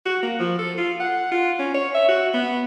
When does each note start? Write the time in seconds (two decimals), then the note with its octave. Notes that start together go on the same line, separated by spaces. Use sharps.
0.06 F#4
0.23 A#3
0.39 F3
0.59 A4
0.78 F4
1.00 F#5
1.32 F4
1.59 C#4
1.74 C#5
1.94 E5
2.08 F#4
2.34 B3